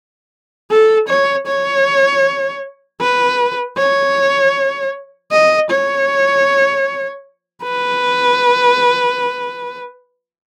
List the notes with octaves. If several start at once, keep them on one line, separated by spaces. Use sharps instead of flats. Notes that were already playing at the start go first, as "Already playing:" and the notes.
A4
C#5
C#5
B4
C#5
D#5
C#5
B4